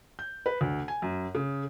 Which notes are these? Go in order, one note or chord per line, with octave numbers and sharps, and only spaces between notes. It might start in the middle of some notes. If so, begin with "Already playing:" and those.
G6
B4
D2
G#5
F#2
C#3